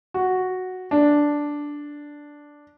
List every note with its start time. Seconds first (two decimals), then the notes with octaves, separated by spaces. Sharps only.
0.14 F#4
0.91 D4